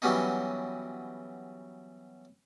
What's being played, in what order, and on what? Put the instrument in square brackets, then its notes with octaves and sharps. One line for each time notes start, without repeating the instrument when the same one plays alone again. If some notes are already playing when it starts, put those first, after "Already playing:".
[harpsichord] E3 F#3 G3 B3 C#4 D#4